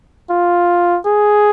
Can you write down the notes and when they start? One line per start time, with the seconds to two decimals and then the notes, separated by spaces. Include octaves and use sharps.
0.30 F4
1.06 G#4